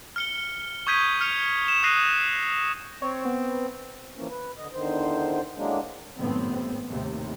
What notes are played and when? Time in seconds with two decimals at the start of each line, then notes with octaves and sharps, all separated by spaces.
0.16 F6 C#7 G7
0.87 C#6 D#6 G6 G#6 B6 D#7
1.21 F6 C#7 F7
1.68 E7
1.83 D#6 E6 F#6 A#6 C7 D#7
3.02 C4 C#5
3.25 B3
4.15 E3 F3 A#3 C#4
4.29 B4
4.57 D3 D#5
4.73 E2 D3 D#3 C5
5.55 F#2 A2 F#3 G#3 A#3 D4
6.18 G#1 F#2 A2 B3 C4
6.88 D#2 A2 C3